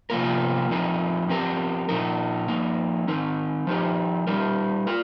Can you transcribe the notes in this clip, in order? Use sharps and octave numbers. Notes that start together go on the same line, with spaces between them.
C3 F3 A#3 F4 A#4
F2 F3 C4 D#4 A#4
F3 C4 G4 A#4
A#2 F3 D#4 A#4
F3 A#3 D#4
D#3 C4 D#4 A#4
F3 D#4 G4 A#4
G3 D#4 G4 A#4
F4 A#4